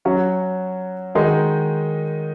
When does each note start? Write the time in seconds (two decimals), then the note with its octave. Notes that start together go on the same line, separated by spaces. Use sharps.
0.05 F#3 C#4 F#4
1.15 D#3 G#3 D#4 F#4